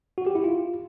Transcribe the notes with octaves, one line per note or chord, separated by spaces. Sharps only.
F#4
G4
E4
F4